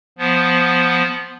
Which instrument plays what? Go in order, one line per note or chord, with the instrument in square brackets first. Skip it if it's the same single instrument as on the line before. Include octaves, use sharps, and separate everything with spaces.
[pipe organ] F3 B3